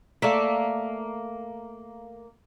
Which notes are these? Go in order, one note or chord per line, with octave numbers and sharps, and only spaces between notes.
A3 A#3 D5 E5